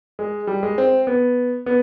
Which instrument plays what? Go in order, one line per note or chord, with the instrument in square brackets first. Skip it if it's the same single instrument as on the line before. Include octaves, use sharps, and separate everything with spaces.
[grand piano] G#3
G3
G#3
C4
B3
B3